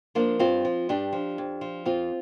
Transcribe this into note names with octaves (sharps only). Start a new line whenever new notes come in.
F3 A#3 D4
G2 C4 F4
F3
G2 D4 G4
F3
F2
F3
F2 C4 F4